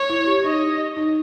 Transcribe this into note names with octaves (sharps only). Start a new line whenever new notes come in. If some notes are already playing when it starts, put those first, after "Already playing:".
Already playing: C#5
E4
G4
D#4 D#5
D#4